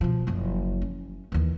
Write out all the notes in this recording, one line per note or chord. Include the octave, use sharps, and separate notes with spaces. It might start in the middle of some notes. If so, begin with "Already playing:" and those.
B2 F3
F#1 F3
C#4
D#2 E3